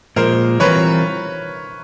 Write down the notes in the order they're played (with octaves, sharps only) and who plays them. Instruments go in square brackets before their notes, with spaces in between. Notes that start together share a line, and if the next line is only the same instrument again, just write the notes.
[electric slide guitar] A#2 F3 G#3 [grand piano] A#4 C5
[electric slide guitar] E3 G3 C4 F4 A#4 [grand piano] B4 C#5